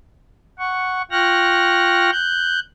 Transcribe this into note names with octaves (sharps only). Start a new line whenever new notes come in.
F#5 C#6
F4 G5 C#6 F6 F#6 A#6
F#6 G6